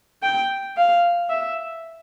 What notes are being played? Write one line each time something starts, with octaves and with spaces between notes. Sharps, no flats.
G5
F5
E5